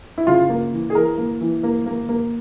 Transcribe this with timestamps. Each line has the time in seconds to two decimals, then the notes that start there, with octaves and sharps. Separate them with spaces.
0.18 E4
0.27 C#3 F4
0.49 A#3
0.73 E3
0.90 G#4
0.95 E3 A#4
1.18 A#3
1.41 E3
1.63 A#3
1.86 A#3
2.09 A#3